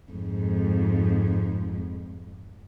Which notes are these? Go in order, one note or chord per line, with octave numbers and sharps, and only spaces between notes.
F2 G#2